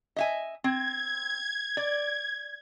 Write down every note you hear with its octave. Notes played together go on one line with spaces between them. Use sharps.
D#5 E5 G#5
C4 G#6
D5